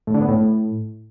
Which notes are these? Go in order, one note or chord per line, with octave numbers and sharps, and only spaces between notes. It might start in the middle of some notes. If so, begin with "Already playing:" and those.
A2
D3
B3
A2